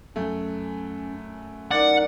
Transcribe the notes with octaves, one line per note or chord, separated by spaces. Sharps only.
F#2 A3 C#4
D#4 A#4 D5 F#5